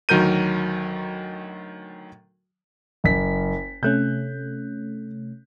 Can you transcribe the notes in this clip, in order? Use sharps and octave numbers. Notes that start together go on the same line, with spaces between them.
D2 D#3 F#3 A#4 G6 D#7
F#1 B6
C3 A3 C#4 F#6 G6